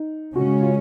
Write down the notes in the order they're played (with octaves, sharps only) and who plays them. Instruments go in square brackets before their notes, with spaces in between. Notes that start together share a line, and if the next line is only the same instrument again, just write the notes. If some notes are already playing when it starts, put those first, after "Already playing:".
Already playing: [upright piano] D#4
[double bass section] C#3 G#3 C#4 [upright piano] F#4
[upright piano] F4